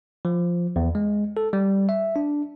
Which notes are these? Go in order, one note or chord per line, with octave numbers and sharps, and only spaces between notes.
F3
E2
G#3
A4
G3
E5
D4